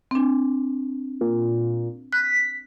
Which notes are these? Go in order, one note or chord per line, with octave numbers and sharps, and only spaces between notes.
C4 D4
A#2
F#6 B6